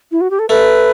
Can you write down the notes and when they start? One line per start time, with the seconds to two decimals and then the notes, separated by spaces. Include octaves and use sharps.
0.12 E4
0.21 F#4
0.30 G4
0.39 A4
0.49 A3 B4